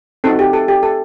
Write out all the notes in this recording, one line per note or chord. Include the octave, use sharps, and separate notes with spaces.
C4 D#4 F#4 A4
G4
A4
G4
A4